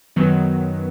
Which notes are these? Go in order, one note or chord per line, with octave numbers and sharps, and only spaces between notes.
F#2 D#3 F#3 B3